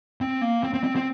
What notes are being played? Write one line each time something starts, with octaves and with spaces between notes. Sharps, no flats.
C4
A#3
C4
C4
C4
C4